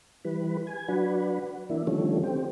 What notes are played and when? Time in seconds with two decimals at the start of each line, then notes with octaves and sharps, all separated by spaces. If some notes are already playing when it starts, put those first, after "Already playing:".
0.25 E3 G3 B4
0.67 G#5
0.88 F#3 D4 F#4 B4
1.70 E3 A#3 D4 E4
1.87 D3 D#3 F3 G3 A3 C#4
2.24 C4 G4